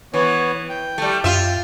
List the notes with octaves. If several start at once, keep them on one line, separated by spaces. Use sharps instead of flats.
E3 B3 C#5
G5
G3 A3
F#2 F4 E5